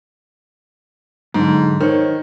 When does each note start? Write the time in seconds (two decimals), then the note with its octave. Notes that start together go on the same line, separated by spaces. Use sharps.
1.34 G#2 D3 F#3
1.81 D#3 C5 C#5